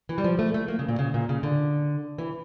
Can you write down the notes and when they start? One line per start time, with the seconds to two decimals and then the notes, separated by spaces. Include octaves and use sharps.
0.09 E3
0.18 G3
0.24 F3
0.39 A3
0.54 A3
0.68 A#3
0.79 C#3
0.88 A#2
0.99 C#3
1.14 A#2
1.29 C#3
1.43 D3
2.18 E3